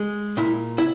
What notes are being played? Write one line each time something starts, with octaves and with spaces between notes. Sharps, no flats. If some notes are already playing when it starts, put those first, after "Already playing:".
Already playing: G#3
A#2 E4
E4